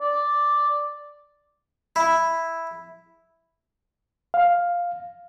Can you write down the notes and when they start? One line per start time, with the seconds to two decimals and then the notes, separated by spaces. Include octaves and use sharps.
0.01 D5
1.96 E4
4.34 F5